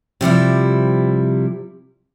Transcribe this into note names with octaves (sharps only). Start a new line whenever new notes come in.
C3 F3 G3 E4